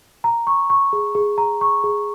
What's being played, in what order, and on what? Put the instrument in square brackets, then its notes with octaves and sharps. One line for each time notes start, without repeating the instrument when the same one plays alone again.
[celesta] A#5
C#6
C#6
G#4
G#4
A#5
C#6
G#4